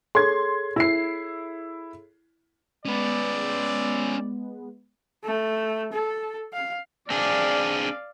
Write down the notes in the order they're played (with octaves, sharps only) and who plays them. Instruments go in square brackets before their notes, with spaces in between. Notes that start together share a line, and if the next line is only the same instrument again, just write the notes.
[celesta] G#4 A4 C#5 [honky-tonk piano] C6 G#6
[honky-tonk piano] E4 C7
[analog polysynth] G#3 B3 [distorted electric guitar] C#4 B4 [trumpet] D5
[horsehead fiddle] A3
A4
F5
[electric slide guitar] C4 D4 G#4 [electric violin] D5 F5